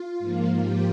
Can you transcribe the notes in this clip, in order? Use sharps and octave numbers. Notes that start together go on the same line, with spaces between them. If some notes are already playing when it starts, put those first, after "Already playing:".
Already playing: F4
G#2 F3 A#3
G4